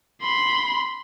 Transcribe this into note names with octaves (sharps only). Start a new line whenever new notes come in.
B5 C6